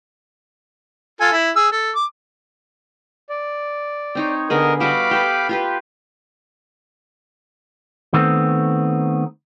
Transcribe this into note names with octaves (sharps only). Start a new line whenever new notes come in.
F4 A4 G#5
E4
G#4 E6
A4
D6
D5
C4 D#4 C#5
D3 B3 G#4 A#4 D#5
G3 F#4 D#5 F5 B5 D6
G4 A4 B4
F4 G4 B4
D#3 A3 B3 C4